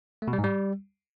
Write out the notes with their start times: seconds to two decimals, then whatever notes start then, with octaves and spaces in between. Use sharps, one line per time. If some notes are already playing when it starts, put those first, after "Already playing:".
0.22 A3
0.28 B2
0.33 G3
0.38 G#2
0.44 G3